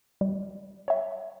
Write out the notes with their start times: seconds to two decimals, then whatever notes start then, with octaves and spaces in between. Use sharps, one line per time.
0.21 G3
0.88 C#5 E5